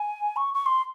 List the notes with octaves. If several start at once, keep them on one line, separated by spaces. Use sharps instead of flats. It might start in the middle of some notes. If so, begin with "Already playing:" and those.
Already playing: G#5
C#6
C#6
C6